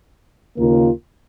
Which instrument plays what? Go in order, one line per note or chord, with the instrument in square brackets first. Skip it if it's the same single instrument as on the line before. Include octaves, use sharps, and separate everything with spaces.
[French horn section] D#2 C#3 A#3 F4 A#4